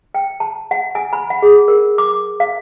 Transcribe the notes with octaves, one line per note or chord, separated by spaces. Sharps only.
G5
A5
F#5
G#5
B5
F#5
G#4
A#4
D6
F5